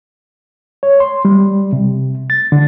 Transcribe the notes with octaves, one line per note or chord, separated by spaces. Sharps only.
C#5
C6
G3
C3
A6
D3